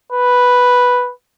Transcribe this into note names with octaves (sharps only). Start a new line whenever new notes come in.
B4